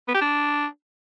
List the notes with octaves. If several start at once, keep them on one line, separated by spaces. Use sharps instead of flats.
B3
G4
D4